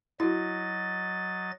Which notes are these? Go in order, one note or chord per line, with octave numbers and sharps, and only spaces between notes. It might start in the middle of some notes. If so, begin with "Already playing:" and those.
F#3 E4 F#4 D#5 A6